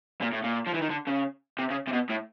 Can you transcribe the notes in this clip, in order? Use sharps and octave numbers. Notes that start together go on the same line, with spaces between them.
A#2
A2
A#2
F3
E3
D#3
D3
C#3
C3
C#3
C3
B2
A2